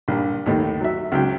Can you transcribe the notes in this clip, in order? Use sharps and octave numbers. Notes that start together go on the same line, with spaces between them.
A#1 G2
D#2 A2 D#4
F#3 E5
C#2 F#3 G5